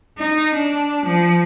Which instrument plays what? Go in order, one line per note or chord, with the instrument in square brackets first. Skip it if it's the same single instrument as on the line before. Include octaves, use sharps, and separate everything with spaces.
[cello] D#4
D4
F3